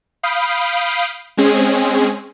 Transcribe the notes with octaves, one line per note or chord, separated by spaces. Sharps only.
F5 B5 D#6 G6 C7 D7
G#3 C4 C#4 G#4